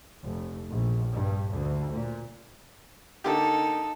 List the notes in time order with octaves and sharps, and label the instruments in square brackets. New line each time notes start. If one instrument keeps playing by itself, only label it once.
[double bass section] F1
A#1
G2
D2
A#2
[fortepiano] D3 A#3 G4 [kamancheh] D#4 A4